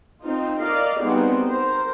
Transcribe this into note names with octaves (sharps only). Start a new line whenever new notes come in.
C4 D#4 F4
A#4 D5 D#5 F5
G3 B3 C4 D#4 F#4 G#4
A#4 C5